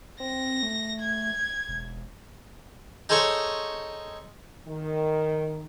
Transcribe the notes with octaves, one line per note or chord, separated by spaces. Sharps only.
C4 A#6
A3
G#6
E1
D#4 G#4 A4 C5 C#5 C#6
D#3